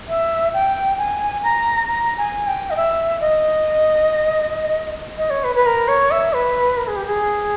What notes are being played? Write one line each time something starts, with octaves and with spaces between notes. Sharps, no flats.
E5
G5
G#5
A#5
A#5
G#5
G5
D#5
E5
D#5
D#5
C#5
B4
B4
A#4
C#5
E5
B4
A#4
G#4
G4
G#4